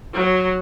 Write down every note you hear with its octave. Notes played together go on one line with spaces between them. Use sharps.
F#3